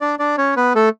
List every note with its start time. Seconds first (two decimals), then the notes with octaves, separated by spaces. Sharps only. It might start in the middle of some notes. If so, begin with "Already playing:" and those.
0.01 D4 D5
0.19 D4 D5
0.38 C#4 C#5
0.57 B3 B4
0.75 A3 A4